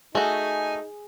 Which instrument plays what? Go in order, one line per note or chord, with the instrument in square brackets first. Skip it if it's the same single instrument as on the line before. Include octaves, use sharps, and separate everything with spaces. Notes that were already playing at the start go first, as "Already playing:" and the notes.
[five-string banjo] A3 F#4 [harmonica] D#4 [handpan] G#4 [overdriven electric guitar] G#5